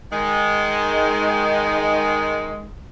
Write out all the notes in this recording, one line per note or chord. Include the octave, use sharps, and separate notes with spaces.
D#3 G#3